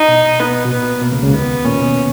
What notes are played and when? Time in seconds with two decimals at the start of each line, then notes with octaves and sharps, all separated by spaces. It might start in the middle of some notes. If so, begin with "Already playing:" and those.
Already playing: D#4
0.08 B2
0.39 B3
0.65 B2
0.71 A#2 B3
1.02 B2 A#3
1.12 C#2 C#3
1.23 C#2 C#3
1.33 D#2 D#3 B3
1.64 A#2 A#3 C#4
1.80 B2 B3